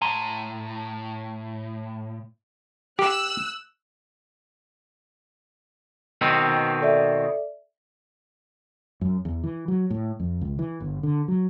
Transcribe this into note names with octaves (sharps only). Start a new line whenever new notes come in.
A2 G#5 A#5 C6
G4 E6 F#6
B2 D#3 C4
A4 D5 E5
F#2
E2
E3
F#3
A2
F2
C#2
E3
G1
D3
F#3